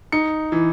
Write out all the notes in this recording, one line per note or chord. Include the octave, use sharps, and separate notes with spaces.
D#4 C#7
E3